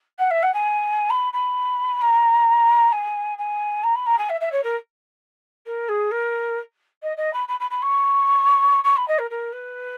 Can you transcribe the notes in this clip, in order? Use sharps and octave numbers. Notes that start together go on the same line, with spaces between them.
F#5
E5
F#5
G#5
B5
B5
A#5
G#5
G#5
A#5
B5
A#5
G#5
E5
E5
C#5
A#4
A#4
G#4
A#4
D#5
D#5
B5
B5
B5
B5
C#6
C#6
B5
D#5
A#4
A#4
B4